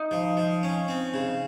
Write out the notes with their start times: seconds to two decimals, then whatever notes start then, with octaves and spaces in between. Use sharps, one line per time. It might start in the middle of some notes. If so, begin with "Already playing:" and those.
Already playing: D#4
0.11 F3
0.37 F3
0.63 C#4
0.88 C4
1.14 C#3